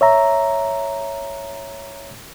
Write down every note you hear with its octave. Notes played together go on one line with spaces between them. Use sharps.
C#5 E5 A#5